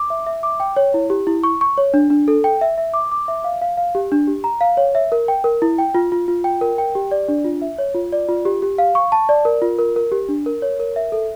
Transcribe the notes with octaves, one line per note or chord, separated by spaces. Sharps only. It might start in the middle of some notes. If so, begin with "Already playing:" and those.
Already playing: D6
E5
E5
D6
G5
C#5
E4
G4
E4
C#6
C#6
C#5
D4
D4
A4
G5
E5
E5
D6
D6
E5
F5
F5
F5
G4
D4
G4
A#5
F5
C#5
E5
A#4
G5
A#4
E4
G5
F4
F4
F4
G5
A#4
G5
G4
D5
D4
F4
E5
C#5
F4
D5
F4
G4
G4
F5
C#6
A5
D5
A#4
F4
A#4
A#4
G4
D4
A#4
C#5
A#4
E5
A4